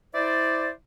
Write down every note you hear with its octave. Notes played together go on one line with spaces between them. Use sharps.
E4 C5 D5